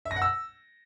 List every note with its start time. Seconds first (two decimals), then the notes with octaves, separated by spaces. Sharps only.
0.05 E5
0.11 A#6
0.16 F#5
0.22 E6